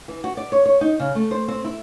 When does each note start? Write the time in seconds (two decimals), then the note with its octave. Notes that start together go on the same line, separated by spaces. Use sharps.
0.08 E3
0.24 F#4
0.37 D5
0.52 C#5
0.66 C#5
0.81 D#4
0.99 C#3
1.15 A3
1.31 C5
1.48 C4
1.65 E4